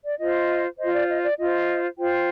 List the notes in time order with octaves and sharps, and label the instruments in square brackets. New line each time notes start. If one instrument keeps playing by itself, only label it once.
[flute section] D5
F4 C5 D#5
F4 C5 D#5
D5
D#5
D5
F4 C5 D#5
F4 C5 G5